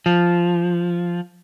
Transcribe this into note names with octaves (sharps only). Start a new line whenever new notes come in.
F3